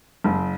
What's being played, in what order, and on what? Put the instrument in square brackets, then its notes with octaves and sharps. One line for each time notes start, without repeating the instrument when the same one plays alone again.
[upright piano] F#1